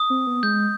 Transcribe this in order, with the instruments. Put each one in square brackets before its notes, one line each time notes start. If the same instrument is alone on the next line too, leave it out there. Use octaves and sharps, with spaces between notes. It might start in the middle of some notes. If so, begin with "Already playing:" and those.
Already playing: [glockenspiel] D#6
[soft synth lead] C4
B3
[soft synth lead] G#3 [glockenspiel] G6